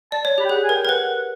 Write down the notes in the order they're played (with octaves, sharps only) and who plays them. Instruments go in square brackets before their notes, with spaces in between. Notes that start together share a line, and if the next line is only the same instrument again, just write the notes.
[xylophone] D5 [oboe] A5
[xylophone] C#5
[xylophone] G4 [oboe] B5
[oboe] G5
[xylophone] G#4 [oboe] F#5
[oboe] G#5
[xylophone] A#4
[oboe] G5
[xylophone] A#4
[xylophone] B4 [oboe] F#5